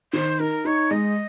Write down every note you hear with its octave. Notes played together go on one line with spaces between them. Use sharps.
D#3 C5
D#4 A#4
D#4 C#5
G#3 D#5